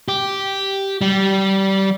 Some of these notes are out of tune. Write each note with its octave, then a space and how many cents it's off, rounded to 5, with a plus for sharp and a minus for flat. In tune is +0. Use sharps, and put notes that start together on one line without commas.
G4 -5
G3 -20